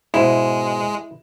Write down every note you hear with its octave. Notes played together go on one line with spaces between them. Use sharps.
G#2 B2 G#3 E4 C5 E7